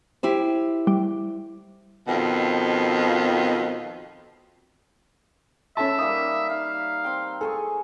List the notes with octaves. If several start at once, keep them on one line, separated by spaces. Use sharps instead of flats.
E4 G4 C5
G3
F2 B2 D#3
C#4 A4 B4 C#5 E5 A5
G3 A#3 D#4 D#6
D#4 F5
C4 G5
G#4 A4 G#5 C#6